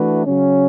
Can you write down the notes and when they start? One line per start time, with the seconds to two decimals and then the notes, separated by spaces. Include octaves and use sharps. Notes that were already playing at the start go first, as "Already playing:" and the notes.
Already playing: E3 A3 D4 F#4 B4
0.26 C#3 F#3 C#4